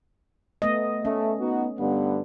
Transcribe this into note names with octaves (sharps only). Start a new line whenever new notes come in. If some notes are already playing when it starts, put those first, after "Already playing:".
A3 B3 D#5
A3 C#4
B3 D#4 F#4
G2 D3 B3